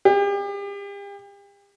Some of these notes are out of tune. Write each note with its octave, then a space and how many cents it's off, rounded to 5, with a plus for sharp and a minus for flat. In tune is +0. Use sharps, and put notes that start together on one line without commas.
G4 +40